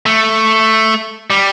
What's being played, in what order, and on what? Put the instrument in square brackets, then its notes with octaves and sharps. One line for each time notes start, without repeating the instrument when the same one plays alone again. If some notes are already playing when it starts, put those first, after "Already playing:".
[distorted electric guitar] A3
G3